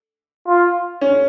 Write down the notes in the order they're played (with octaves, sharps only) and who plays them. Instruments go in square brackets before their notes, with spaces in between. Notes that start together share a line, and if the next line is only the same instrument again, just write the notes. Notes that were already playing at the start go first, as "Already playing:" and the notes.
[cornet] F4
[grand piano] C#4